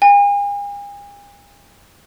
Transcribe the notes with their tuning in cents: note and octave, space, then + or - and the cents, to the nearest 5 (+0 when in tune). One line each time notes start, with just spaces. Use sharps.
G#5 -45